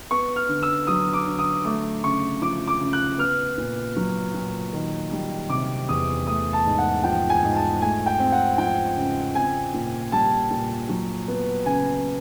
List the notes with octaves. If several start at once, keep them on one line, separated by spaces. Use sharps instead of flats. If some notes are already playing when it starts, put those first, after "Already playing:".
B3 C#6
F6
D3
E6
F#3 D#6
D6
D3
D#6
A3 D6
C#3 C#6
F3 D6
D6
C#3
F#6
B3 F6
A#2
F#3
A#2
D#3
G3
C3 D6
E2 D#6
A3 D#6
A5
G#2
F#5
F3 G5
G#5
G#2
A5
A3 G#5
G5
C4
F#5
F3 G5
C#3
C4 G#5
A#2
G3 A5
A#2
F#3
B3
C#3 G#5